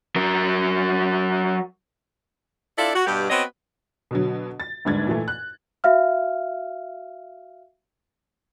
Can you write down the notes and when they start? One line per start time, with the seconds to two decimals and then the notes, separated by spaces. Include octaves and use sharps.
0.16 F#3 A#4
2.77 D4 E4 F4 A4 D5
2.95 F#4
3.06 G2 B2 G4
3.30 B3 C4 F#4 B4 C#5 D#5
4.11 B2 D3 F#3
4.60 A6
4.85 G1 D#2 G#2 D4 G#6 A6
5.07 A#2 E3 A3
5.28 F#6
5.84 F#4 E5 F5 F6